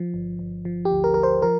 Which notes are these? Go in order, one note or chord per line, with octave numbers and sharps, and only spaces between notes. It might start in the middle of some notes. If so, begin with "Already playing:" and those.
Already playing: F3
G1
G1
F3
G4
D2
A#4
D2 A#4
C5
F3 A#4